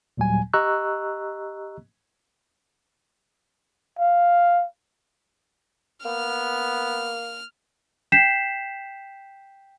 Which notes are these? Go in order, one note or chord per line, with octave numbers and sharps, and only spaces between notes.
D#2 A#2 F#3 G3 G#5
G4 D#5 A#5 C#6 E6 F#6
F5
A#3 B3 F6
G5 G6 B6 C7 E7